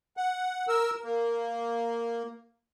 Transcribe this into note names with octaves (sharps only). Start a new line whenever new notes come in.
F#5
A#4 E6
A#3